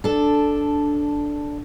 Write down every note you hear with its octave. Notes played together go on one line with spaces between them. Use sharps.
D4 A4